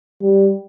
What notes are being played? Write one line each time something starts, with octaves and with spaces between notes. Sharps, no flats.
G3